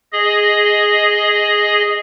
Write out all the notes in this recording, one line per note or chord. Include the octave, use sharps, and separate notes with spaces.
G#4 D#5